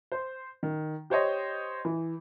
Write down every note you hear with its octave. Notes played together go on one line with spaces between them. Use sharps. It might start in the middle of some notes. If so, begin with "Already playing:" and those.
C5
D#3
G4 C5 C#5 D#5
E3